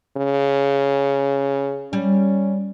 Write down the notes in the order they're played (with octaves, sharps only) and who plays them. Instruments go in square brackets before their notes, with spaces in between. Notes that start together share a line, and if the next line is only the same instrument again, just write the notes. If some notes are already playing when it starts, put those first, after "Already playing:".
[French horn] C#3
[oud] G3 [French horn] C#4